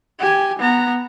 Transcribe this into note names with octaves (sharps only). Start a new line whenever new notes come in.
G4 G#5
B3 A#5